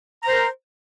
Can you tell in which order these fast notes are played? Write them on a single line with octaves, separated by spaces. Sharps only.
A#5 C5 A#4